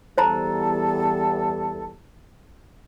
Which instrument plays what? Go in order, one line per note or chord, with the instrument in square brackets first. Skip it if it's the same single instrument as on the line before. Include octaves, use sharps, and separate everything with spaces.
[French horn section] E2 G3 [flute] A4 [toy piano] C5 A5 A#5